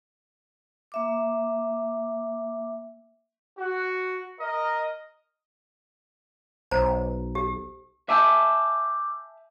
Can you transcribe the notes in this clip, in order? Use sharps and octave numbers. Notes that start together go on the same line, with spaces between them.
A#3 E5 D6
F#4
A#4 D#5
B1 C5 A#5
G4
E5 G#5 A5 D6 E6 G6